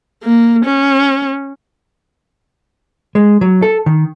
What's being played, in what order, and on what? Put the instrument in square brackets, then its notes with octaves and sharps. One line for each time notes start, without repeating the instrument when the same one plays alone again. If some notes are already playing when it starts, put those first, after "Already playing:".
[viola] A#3
C#4
[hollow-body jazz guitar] G#3
F#3
A4
D#3